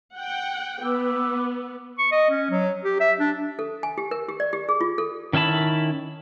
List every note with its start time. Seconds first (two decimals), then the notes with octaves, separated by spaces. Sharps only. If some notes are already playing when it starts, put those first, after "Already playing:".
0.15 F#5 G5
0.83 B3 B4 D6 E6
1.98 C#6
2.11 D#5
2.30 C#4
2.50 F#3
2.84 G4
3.00 E5
3.20 D4
3.59 A4
3.83 G#5
3.98 G4
4.11 A#4
4.29 G4
4.40 D5
4.53 G4
4.69 G#4
4.81 F4
4.98 A4
5.33 D#3 C#4 E4 A5 B5